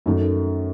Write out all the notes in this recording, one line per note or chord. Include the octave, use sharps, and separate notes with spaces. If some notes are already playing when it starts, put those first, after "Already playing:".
F#2 D#3 A3